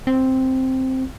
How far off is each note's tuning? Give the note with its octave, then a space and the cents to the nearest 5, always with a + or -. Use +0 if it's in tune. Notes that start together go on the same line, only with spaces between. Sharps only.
C4 +0